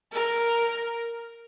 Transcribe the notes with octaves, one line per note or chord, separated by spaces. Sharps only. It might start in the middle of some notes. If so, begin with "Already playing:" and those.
A#4